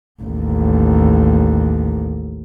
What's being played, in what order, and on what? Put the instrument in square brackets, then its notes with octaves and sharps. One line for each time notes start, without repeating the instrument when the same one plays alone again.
[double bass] A1 D#2